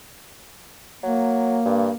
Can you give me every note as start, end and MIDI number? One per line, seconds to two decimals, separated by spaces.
1.03 1.60 54
1.03 1.96 58
1.65 1.90 43